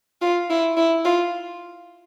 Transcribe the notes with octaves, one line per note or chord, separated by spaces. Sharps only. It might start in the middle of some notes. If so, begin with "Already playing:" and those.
F4
E4
E4
F4